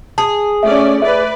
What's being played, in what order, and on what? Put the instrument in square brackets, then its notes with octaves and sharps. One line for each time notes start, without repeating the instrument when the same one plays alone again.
[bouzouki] G#4 [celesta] A5
[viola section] A3 C#4 D5 [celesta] E5
[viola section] B4 D5 [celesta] E5